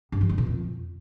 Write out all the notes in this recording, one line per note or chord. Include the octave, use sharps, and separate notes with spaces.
G2
F3
D3
A#2
F2